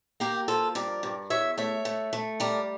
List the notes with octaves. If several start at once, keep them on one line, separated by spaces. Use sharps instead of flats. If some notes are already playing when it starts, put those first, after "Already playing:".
A#3 G4 A#4
F3 F4 A4
G2 A#4 D5
G2
E2 C#5 E5
A3 C#5 E5
A3
A3
G3 A#4 D5